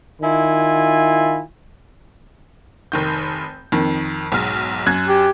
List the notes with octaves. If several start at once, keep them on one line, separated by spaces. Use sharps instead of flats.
D#3 E4 F4 G#5
F1 D#3 G6
F2 D#3
B1 G#2 F6
F#2 F#6 G#6
G4